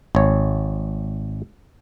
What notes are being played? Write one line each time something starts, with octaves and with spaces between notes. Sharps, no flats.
G#1 C#5